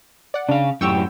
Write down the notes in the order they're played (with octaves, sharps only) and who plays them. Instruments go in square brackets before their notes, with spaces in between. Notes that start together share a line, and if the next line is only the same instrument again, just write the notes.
[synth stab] D5 F#5
[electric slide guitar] C#3 F5 [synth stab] D4
[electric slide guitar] F#2 A2 G4 [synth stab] G5 C#6 E6